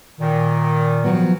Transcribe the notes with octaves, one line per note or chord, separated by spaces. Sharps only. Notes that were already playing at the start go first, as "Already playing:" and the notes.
A#2 D#3
F3 F#3 B3